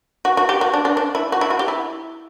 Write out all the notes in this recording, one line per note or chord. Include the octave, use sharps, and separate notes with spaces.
F#4
F#4
G4
F#4
D4
D4
D4
E4
F#4
E4
F#4
G4
E4